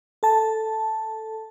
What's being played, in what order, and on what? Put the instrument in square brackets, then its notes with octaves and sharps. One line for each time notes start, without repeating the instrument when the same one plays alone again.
[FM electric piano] A4 A5